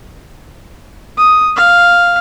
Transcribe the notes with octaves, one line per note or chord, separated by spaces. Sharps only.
D#6
F5